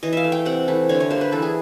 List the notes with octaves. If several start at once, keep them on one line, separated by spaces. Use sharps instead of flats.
E3 D#5
E5 F5
A3
G5
C3 F#5
E3 A3
D3 C#5
C#5
G3 A#3 C5
B4
E3 A4
G#4